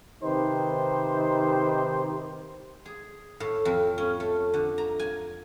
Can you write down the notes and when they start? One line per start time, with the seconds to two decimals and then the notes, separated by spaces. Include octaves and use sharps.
0.23 C3 D#3 D#4 G4 B4 C5
2.86 G#4
3.40 A2
3.65 F2
3.98 C#4
4.20 A3
4.54 D3
4.78 A#5
4.99 G#5